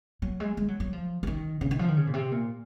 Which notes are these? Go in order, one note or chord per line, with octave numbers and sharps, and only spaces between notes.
F#3
G#3
G#3
F#3
F#3
F3
F3
D#3
C#3
D#3
F3
D#3
C#3
A#2
C3
A#2